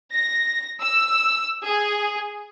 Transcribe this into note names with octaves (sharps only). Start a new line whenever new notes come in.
A#6
E6
G#4